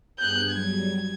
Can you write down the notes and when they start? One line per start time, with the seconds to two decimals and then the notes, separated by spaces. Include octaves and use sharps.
0.19 G2 B3 G#4 F#6 G6
0.51 F#3 G3 G#6